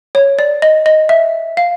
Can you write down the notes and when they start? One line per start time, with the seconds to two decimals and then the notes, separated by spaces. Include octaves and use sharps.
0.15 C#5
0.39 D5
0.62 D#5
0.86 D#5
1.09 E5
1.57 F5